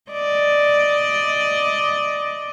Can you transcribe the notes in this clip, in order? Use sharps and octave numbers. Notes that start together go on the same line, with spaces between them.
D5 D#5